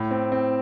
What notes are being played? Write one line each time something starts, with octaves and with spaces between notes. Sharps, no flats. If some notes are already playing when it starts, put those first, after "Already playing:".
Already playing: A2
C4
C4